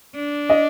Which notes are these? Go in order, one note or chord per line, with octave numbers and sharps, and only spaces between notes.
D4
D#5